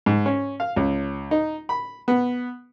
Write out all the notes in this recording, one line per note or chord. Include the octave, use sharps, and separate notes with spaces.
G#2
C#4
F5
C#2
D#4
B5
B3